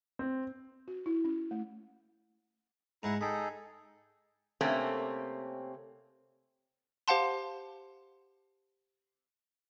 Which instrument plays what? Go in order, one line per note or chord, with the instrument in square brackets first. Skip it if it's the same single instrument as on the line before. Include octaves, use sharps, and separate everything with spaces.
[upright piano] C4
[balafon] F#4
E4
C#4
A3
[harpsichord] G#2 G#3 F#5 [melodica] E4 A#5
[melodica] D#4 G#4 A4 [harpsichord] G5 B5
[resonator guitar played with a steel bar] C3 A3 A#3 C4 C#4
[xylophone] G4 C5 F5 F#5 A5 C6